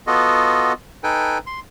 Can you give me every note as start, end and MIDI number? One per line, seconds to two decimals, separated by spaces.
0.07 0.73 59
0.07 0.73 65
0.07 0.73 66
0.07 0.73 69
0.07 0.73 75
1.04 1.38 63
1.04 1.38 69
1.04 1.38 71
1.04 1.38 79
1.04 1.38 80
1.47 1.60 84